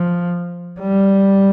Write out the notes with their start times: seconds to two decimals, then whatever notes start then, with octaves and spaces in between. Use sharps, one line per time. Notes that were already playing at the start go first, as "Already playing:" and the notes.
Already playing: F3
0.80 G3